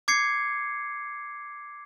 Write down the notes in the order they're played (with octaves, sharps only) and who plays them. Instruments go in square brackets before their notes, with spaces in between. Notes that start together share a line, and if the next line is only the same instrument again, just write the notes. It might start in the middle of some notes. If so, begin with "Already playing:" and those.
[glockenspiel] D6 G#6 C7 C#7